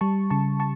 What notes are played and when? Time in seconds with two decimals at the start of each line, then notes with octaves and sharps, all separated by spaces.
0.01 G3 A5 C#6
0.30 C#3 A5 C#6
0.60 A5 C#6